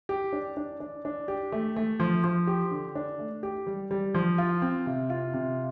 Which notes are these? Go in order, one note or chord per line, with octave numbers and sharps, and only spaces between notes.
G4
D4
D4
D4
D4
G4
A3
A3
F3
F3
G4
D3
D4
A3
G4
G3
G3
F3
F4
C4
C3
F4
C3